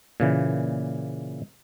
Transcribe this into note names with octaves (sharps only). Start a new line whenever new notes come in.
A#2 C#3 E3